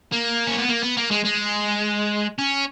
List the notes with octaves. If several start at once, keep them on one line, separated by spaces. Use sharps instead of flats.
A#3
C#4
B3
A#3
B3
A#3
G#3
G#3
C#4